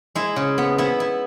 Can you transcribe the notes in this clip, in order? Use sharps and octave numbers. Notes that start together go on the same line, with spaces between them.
G#3 E4
C#3
B3
B3 E4
E4